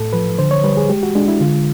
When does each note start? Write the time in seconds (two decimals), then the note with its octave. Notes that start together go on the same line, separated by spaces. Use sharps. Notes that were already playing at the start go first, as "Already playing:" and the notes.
Already playing: A2 A4
0.13 F3 B4
0.39 D3 C5
0.51 C#5
0.64 G3 B4
0.77 G#4
0.89 G#3 G4
1.03 F#4
1.15 G#3 D4
1.28 E4
1.40 D3 F4